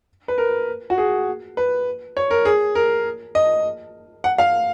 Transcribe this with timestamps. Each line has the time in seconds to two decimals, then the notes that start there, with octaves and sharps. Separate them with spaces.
0.28 B4
0.38 A#4
0.90 F#4
0.98 G#4
1.57 B4
2.17 C#5
2.31 A#4
2.45 G#4
2.75 A#4
3.35 D#5
4.24 F#5
4.38 F5